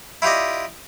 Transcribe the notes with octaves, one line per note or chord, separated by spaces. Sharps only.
E4 F4 G4 D5 D#5